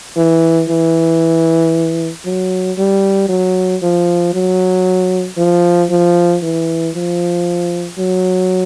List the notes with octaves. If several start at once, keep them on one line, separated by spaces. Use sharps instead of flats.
E3
E3
F#3
G3
F#3
F3
F#3
F3
F3
E3
F3
F#3